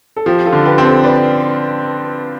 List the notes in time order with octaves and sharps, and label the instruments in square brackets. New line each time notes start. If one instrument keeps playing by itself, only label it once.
[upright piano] A4
[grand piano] F3 [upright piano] G4
[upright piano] F4 A4
[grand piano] D3
[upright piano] G4 B4
[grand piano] C4
[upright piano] A4 C5
B4 D5